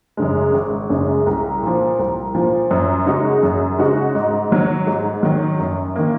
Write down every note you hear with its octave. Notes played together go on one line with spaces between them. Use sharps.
F#2 C#3 G#3
G#1
F#2 C#3 G#3
C2
A#2 F3
C2
A#2 F3
F#2
C#3 G#3 D#4 F#4
F#2
C#3 G#3 D#4 F#4
G#2
D#3 F#3
G#2
D#3 F#3
F#2
D#3 A#3